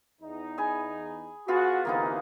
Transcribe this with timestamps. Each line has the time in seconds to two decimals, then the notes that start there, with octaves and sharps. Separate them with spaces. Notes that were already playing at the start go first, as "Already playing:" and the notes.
0.22 E2 D#4
0.58 G#4 G#5 B5
1.48 B3 F4 F#4 G#4
1.85 D2 C3 E3 A#3 B3 D#4